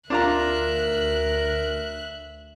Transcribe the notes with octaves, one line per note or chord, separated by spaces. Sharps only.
D2 D4 F4 A#4 E5 A#5 F#6